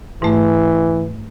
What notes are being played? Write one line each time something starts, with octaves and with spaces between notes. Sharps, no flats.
G#2 E3 A3